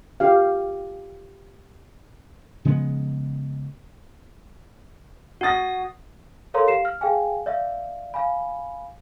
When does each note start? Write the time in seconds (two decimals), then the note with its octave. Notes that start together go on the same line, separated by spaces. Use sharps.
0.20 F4 G4 F5
2.65 C#3 F3 G#3 B3
5.41 F#4 F#5 D#6 A6 A#6
6.54 A4 A#4 C#5 F5 A#5 C6
6.66 G4 F5 C7 E7
6.85 F6
7.01 G#4 F5 G5 G#5
7.46 D5 E5 F5
8.14 F5 G#5 B5